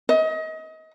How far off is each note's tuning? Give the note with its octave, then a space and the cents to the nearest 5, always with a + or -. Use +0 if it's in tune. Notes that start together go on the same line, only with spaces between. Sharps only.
D#5 +30